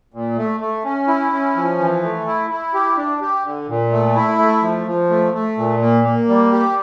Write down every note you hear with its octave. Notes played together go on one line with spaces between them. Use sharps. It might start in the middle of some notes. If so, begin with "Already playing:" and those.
A#2
A3
A3
C#4
E4
C#4
F3
E3
A3
E4
E4
G4
D4
G4
D3
A#2
A3
E4
A3
F3
F3
A3
A3
A#2
A#3
A#3
G3
G4